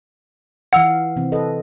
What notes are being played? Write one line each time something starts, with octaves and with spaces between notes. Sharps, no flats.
E3 F5 F#5 E6
C3 E3 C4
A4 B4 D#5